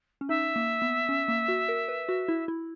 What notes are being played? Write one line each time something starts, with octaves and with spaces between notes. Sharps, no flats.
C#4
D#4 E5
A#3
B3
C#4
A#3
F#4
A#4
B4
F#4
E4
E4